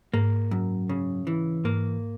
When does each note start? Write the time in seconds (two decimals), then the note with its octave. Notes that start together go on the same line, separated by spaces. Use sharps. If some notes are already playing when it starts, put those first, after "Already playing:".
0.14 G#2 A#3
0.51 F#2
0.89 C#3
1.27 E3
1.64 G#2 A#3